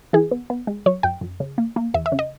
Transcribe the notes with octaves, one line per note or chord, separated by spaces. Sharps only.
E3 G#4
B3
B3
G#3
F#3 C#5
F#2 G5
F#2
C#3
A#3
A#3
E2 E5
E5
C#3
D#5